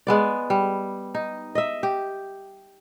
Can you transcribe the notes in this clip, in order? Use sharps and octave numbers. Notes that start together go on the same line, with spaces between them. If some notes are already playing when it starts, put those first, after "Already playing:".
G#3 B3 D5
G3
D#4
D#5 E5
G4